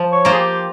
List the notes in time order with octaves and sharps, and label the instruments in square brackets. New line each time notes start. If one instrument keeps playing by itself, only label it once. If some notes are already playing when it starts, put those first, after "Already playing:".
Already playing: [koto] F3
[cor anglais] C#5
[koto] A#3 F4 C5
[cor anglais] G#4
G4